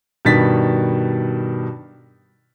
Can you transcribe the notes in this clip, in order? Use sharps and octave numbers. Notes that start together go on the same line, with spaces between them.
G2 B2 D#3 A6 B6